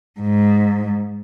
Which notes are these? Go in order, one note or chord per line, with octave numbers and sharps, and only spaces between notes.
G#2